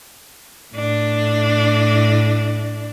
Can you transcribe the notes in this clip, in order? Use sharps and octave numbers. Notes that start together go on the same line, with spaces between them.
A2 D4